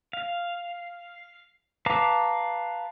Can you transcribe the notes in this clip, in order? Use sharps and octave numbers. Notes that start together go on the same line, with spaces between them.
F5
B4 F5 A5 A#5 D6